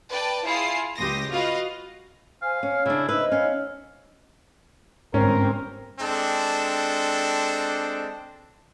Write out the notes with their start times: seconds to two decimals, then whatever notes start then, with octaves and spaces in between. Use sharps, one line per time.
0.10 B4 D5 G5 A5
0.44 E4 F4 G#4 C7
0.97 C#2 G4 C6 D#6 A#6
1.32 F4 F#4 B4 D#5 F5
2.42 C5 F5 G#5
2.63 C#4 C#5 F6
2.86 C#3 D4 E4
3.09 D#4 B4 C5 D#5 E5
3.32 C#4 F5
5.14 G1 G#2 C4 C#4 A#4
6.00 G#3 C4 D4 A4